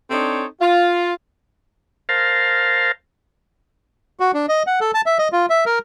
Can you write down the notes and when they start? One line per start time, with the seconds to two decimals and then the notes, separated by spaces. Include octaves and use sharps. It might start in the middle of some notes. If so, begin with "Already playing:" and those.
0.11 C4 D4 D#4 A4 C#5
0.61 F4
2.09 A#4 C5 F5 A5
4.20 F#4
4.34 D4
4.49 D#5
4.67 F#5
4.81 A4
4.94 A5
5.06 E5
5.19 D#5
5.32 F4
5.50 E5
5.66 A#4